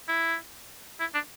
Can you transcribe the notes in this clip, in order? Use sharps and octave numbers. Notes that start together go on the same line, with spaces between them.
E4
E4
D4